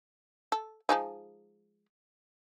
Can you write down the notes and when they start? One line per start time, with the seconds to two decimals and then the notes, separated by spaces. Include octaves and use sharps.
0.52 A4
0.89 F3 G#3 D#4